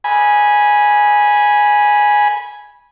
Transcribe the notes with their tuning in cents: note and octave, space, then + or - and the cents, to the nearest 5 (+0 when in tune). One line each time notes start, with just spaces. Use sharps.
G#5 +0 B5 -20